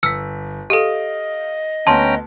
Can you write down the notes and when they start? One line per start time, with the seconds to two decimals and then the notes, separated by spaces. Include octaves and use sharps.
0.03 G1 E6 F6 B6 C#7
0.70 G4 A4 D#5 F5 D#6 D7
1.87 D2 B3 C#4 G5 A5 A#5 C6